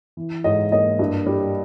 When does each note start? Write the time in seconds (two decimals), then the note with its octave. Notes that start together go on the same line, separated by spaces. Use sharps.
0.17 E3
0.44 G#2 D#5
0.72 A#3 D#5
0.99 G2
1.26 G3